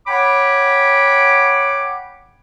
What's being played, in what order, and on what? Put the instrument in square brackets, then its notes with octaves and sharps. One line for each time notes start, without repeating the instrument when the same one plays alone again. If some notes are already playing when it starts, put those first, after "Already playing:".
[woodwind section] C#5 F#5 G5 B5 D6